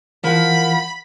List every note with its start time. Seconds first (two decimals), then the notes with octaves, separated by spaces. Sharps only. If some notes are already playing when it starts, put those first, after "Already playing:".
0.24 E3 F3 A#4 F#5 B5